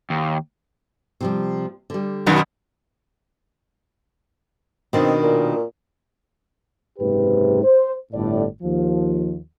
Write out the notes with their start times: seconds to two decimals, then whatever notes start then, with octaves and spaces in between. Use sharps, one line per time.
0.10 D#2
1.21 C3 F3 G3
1.90 D3 G3
2.26 F#2 B2 D#3
4.93 B2 D#3 C4 D4
5.23 A#2
6.99 F#1 G#2 C3 G4 B4
7.63 C5
8.13 G1 A2 D5
8.62 D#2 F3